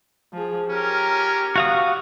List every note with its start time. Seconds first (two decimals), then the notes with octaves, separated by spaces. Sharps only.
0.33 F3 G#4
0.69 C#4 G4 A#4
1.56 F#4 F5 D#6